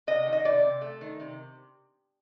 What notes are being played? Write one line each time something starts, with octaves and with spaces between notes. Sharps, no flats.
C3 D#5
D#3
D#5
C3 D5
C3
A3
D#3
C3